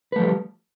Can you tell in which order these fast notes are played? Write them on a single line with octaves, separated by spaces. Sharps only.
B4 A3 F3 G3